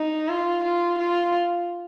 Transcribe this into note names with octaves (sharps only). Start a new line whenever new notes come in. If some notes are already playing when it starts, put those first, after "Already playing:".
Already playing: D#4
F4
F4
F4